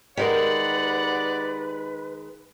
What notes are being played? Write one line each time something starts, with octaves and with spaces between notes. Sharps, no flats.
D#3 G#3 G4 A#4 B4 D5 F#5